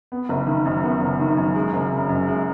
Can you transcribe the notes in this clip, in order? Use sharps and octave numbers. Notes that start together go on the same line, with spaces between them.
B3
F#1
D#3
F#2
B3
F#1
D#3
F#2
G#3
F#1
C#3
F#2
G#3